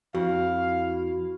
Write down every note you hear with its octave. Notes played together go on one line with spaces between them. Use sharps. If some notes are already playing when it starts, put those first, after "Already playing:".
F2 E4 F#4 F5